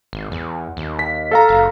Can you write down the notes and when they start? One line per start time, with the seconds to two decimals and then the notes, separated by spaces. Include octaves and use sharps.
0.13 G#1
0.32 E2
0.77 D#2
0.99 B6
1.31 A4 F5 A#5
1.49 F#1